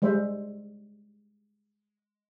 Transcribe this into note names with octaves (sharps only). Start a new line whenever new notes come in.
G3 G#3 C5 E5